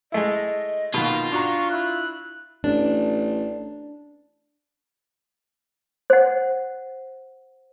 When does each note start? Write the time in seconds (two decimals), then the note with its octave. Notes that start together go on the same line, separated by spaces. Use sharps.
0.12 G#3 A3 E4 D#5
0.94 B2 D#3 A#3 F4 F#4
1.32 D4 F#4 A#5 C#6
1.71 E4 F#6
2.64 A1 D4
6.10 C5 F#5